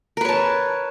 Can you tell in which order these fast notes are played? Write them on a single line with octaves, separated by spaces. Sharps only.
A#4 B4 C#5 A5